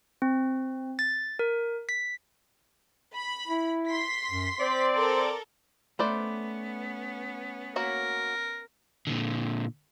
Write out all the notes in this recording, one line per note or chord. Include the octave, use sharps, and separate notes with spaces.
C4
A6
A#4
B6
B5
E4
C6 B6
F#2
C4 C5 D5
A4 A#4
A3 B3 C#4 B4 C5 D5
A#3 F#4 A#4 C#5
A#2 D3